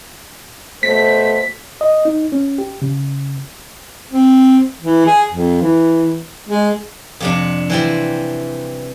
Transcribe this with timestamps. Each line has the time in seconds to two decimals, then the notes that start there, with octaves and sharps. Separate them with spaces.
0.83 B2 A3 C5 B6
1.81 D#5
2.05 D#4
2.32 C#4
2.58 G4
2.82 C#3
4.12 C4
4.82 E3
5.06 G#4
5.32 F2
5.62 E3
6.49 G#3
7.20 F2 C3 D4
7.70 E3 G3 C4